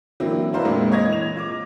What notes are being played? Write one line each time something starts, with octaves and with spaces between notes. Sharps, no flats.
D3 E3 F#3 A#3 C4 E4
D4 E4 B4 C5 F5 A#5
F2 A#2 G#3 A#3 C4
C#5 D#5 G#6 A#6
E3 F7
F4 D6